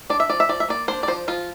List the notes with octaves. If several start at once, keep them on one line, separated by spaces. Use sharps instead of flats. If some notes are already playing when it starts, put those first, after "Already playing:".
D4 D5
E5
F3 D5
E5
F3 D5
E5
A#3 D5
D4 C5
D5
F3 C5
F3 F4